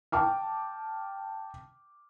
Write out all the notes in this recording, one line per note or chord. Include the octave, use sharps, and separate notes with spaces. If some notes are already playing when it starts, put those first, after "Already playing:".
G5 A5 D6 F6